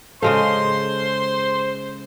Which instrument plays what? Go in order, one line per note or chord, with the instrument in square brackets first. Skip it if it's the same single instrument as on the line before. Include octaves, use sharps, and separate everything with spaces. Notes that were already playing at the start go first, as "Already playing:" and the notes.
[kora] C#3 G#3 F5 [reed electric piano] A4 [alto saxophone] C5 [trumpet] C6